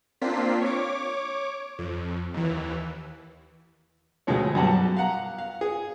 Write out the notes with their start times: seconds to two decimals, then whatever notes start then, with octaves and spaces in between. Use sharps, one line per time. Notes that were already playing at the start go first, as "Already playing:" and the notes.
0.21 A#3 C4 D4 F4 B6 C7
0.61 C#5 D6
1.79 F2
2.34 D#2 E3
4.27 D2 B2 F3 G#3 A3 C#5
4.55 F#2 B2 F#3 G3 F#5 A5
4.97 F5 F#5 A#5
5.38 F5
5.61 G#4